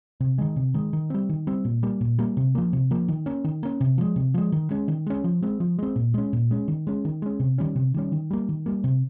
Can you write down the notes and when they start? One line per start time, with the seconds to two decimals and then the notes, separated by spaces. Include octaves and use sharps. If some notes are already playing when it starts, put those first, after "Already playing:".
0.20 C3
0.38 D#3 G#3
0.56 C3
0.74 D#3 G#3
0.93 D#3
1.10 G3 C4
1.29 D#3
1.47 G3 C4
1.65 A#2
1.83 G3 A#3
2.01 A#2
2.19 G3 A#3
2.37 C3
2.55 F3 A#3
2.73 C3
2.91 F3 A#3
3.08 D#3
3.26 A#3 C#4
3.44 D#3
3.63 A#3 C#4
3.81 C3
3.98 F3 G#3
4.16 C3
4.34 F3 G#3
4.52 D#3
4.71 G#3 C#4
4.88 D#3
5.06 G#3 C#4
5.24 F3
5.42 G#3 C4
5.60 F3
5.79 G#3 C4
5.96 A#2
6.14 G#3 C#4
6.33 A#2
6.51 G#3 C#4
6.68 D#3
6.87 G#3 C#4
7.05 D#3
7.22 G#3 C#4
7.40 C3
7.58 D#3 G3 C#4
7.76 C3
7.94 D#3 G3 C#4
8.12 D#3
8.31 G3 A#3
8.49 D#3
8.66 G3 A#3
8.84 C3